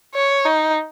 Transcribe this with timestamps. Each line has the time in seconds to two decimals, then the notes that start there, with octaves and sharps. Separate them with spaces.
0.14 C#5
0.45 D#4